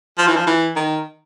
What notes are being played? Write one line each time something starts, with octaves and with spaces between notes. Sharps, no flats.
F3
E3
F3
E3
D#3